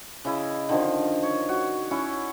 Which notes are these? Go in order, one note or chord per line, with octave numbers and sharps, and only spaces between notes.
C#3 E4 D#5
D3 D#3 F3
C#5
F#4
C#4 E4 C#6